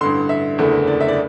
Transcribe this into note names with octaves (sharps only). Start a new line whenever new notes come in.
A1 G2 D3 C6
E5
F#1 E2 D3 A3
D5
E5
D5